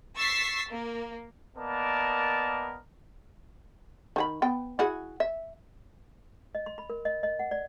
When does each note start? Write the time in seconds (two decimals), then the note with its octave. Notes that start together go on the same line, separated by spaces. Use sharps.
0.16 C#6 E6 A6 B6 C7
0.70 A#3
1.56 A#3 B3 A#4 D5 D#5 A5
4.16 D#3 G#4 B5
4.42 B3 G5
4.79 E4 F#4 G#4
5.20 E5
6.55 D#5
6.66 C6
6.78 B5
6.90 A#4
7.05 D#5
7.23 D#5
7.39 F#5
7.51 D5